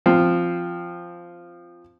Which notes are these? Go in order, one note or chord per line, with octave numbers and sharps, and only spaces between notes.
F3 C4